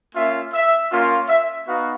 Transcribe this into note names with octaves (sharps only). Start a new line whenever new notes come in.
A#3 C#4 F4 E5
E5
A#3 C#4 F4
E5
B3 D#4 F#4 F5